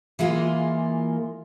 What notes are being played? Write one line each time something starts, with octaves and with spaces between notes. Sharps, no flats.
E3 G#3 A#3 F4